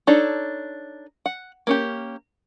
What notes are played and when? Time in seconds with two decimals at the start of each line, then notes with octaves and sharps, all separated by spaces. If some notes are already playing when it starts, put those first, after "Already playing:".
0.07 D4 D#4 A4 C#5
1.26 F#5
1.67 A#3 C#4 G4